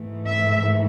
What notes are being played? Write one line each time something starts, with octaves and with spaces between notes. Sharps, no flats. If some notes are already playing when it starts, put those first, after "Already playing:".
Already playing: G#2 E3 A3
E5